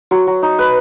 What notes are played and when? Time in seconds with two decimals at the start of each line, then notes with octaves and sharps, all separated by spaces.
0.11 F#3 F#4
0.27 F#3
0.42 D#4
0.59 B4